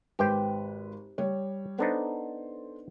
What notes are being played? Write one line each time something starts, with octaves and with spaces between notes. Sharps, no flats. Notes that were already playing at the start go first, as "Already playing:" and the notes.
G#1 G4 B4 C5 G5
G3 C#5
B3 D4 D#4 A4 C5